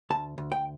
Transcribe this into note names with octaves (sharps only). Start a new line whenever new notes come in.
D2 A5
D2
G5